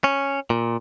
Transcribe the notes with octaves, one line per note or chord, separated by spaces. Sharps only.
C#4
A#2